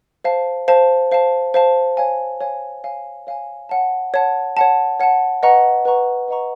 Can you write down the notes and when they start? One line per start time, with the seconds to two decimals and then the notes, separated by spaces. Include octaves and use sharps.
0.24 C5 F5 A5
0.68 C5 F5 A5
1.12 C5 F5 A5
1.54 C5 F5 A5
1.97 C#5 F5 G#5
2.41 C#5 F5 G#5
2.84 C#5 F5 G#5
3.27 C#5 F5 G#5
3.69 C#5 F#5 A5
4.14 C#5 F#5 A5
4.57 C#5 F#5 A5
5.00 C#5 F#5 A5
5.43 B4 D#5 F#5 A#5 C#6
5.85 B4 D#5 F#5 A#5 C#6
6.28 B4 D#5 F#5 A#5 C#6